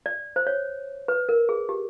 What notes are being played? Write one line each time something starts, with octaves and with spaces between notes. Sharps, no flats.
D5
C5
C#5
B4
A#4
G#4
G4